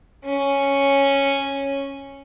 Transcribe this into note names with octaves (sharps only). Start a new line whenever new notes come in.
C#4